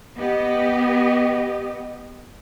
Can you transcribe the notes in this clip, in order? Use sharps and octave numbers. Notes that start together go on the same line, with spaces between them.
B3 G4 D#5